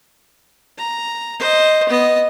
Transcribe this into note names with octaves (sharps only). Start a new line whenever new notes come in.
A#5
C5 D#5
B3 D#5